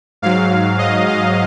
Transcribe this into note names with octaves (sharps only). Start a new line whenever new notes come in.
G#2 F#3 F5
D#5
F5